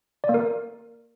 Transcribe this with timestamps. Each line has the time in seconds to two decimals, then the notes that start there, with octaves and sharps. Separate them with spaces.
0.24 D5
0.29 A#3
0.34 A#4